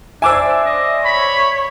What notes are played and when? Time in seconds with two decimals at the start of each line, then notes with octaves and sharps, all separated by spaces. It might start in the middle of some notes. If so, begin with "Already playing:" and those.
0.22 D4 C5 D5 E5 G#5 D6 E6
0.65 D#5
1.05 C#5 B5